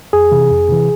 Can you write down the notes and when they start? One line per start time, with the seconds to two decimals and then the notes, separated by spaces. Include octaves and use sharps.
0.13 F2 G#4
0.31 C3 E3
0.51 F2
0.69 C3 E3